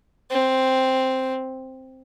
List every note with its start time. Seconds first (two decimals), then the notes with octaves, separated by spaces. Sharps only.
0.31 C4